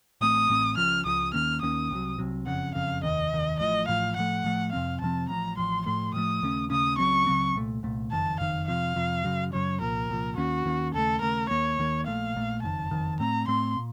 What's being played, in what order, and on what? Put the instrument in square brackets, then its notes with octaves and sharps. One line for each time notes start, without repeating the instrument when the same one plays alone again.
[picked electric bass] A1 A2 A3 C4 [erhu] D#6
[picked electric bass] A1 A2 A3 C4
[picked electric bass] C#2 C#3 F3 [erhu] F6
[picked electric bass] C#2 C#3 F3 [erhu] D#6
[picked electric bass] D#2 D#3 A#3 C#4 [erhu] F6
[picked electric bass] D#2 D#3 A#3 C#4 [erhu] D#6
[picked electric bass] C2 C3 F#3
C2 C3 F#3
[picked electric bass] F#1 F2 C#3 [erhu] F#5
[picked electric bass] F#1 F2 C#3 [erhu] F5
[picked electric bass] F1 D#2 D#3 [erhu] D#5
[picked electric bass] F1 D#2 D#3
[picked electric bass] A1 A2 F3 [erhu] D#5
[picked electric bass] A1 A2 F3 [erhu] F5
[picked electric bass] A2 F3 A3 [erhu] F#5
[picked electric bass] A2 F3 A3
[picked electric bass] F2 C3 F3 C4 [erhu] F5
[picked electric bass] F2 C3 F3 C4 [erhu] A5
[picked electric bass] A1 A2 F3 [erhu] A#5
[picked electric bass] A1 A2 F3 [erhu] C6
[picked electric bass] A2 F3 A3 [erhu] C6
[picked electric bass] A2 F3 A3 [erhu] D#6
[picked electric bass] D#2 C#3 A3 C#4
[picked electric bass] D#2 C#3 A3 C#4 [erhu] D#6
[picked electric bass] C#2 C#3 F#3 C4 [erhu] C#6
[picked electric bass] C#2 C#3 F#3 C4
C2 A#2 A3
C2 A#2 A3
[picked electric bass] F#1 F2 D#3 [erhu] A5
[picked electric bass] F#1 F2 D#3 [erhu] F5
[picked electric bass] F2 C3 F3 [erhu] F5
[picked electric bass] F2 C3 F3
F#2 C#3 F#3
[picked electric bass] F#2 C#3 F#3 [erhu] C#5
[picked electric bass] C2 A#2 F3 [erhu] A#4
[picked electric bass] C2 A#2 F3
[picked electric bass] D#2 D#3 A#3 C#4 [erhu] F#4
[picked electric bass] D#2 D#3 A#3 C#4
[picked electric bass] D#2 C#3 A3 [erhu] A4
[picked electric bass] D#2 C#3 A3 [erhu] A#4
[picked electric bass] D#2 D#3 A#3 [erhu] C#5
[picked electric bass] D#2 D#3 A#3
[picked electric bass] A#1 A#2 A3 [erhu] F5
[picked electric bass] A#1 A#2 A3
[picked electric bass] F#1 F2 D#3 [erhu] A5
[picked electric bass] F#1 F2 D#3
[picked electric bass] A2 A3 C4 [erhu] A#5
[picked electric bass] A2 A3 C4 [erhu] C6
[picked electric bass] A#2